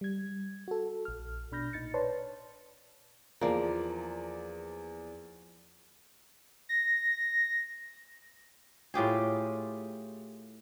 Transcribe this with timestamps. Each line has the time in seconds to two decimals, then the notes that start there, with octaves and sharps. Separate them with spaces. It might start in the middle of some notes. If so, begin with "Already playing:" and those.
0.01 G3 G#6
0.68 F#4 A4
1.05 A#1 F6
1.52 B2 D4 B5 F6 G6 A#6
1.73 A#2 D#4 A6 C#7
1.94 B4 C#5 D5 A5 C6
3.41 E2 F3 A#3 D5
6.69 A#6
8.94 A2 F4 G4 G#4